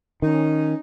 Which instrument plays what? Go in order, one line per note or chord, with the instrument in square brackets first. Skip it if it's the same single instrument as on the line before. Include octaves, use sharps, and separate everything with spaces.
[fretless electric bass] D#3 [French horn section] C#4 [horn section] D#4